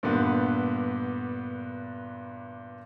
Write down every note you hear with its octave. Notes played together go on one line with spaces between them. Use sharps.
G2 A#2 D3 G3 B3 F#4